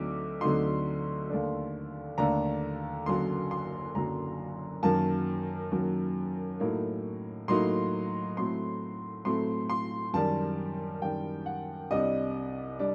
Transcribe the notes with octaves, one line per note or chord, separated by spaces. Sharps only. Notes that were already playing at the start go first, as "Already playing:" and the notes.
Already playing: D2 D3 F#3 C4 D#4 D6
D2 D3 F#3 C4 D#4 C6
D#2 D3 A3 D4
D#2 D3 A3 D4 A#5
F#1 F#2 D3 F#3 C6
C6
F#1 F#2 D3 F#3 A#5
F#2 D#3 F#3 A#3 A5
F#2 D#3 F#3 A#3
A2 F#3 A#3 D#4
A2 F#3 A#3 D#4 C6
A2 F#3 A3 C4 C6
A2 F#3 A3 C4 C6
C6
F#2 D#3 G3 A5
F#2 D#3 G3 G5
F#5
C2 C3 G3 D4 D#5
G3 D4